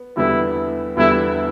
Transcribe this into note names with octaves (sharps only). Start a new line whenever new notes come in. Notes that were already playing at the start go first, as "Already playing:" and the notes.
Already playing: B3
E2 D3 G3 B3 E4
E2 D3 G3 B3 E4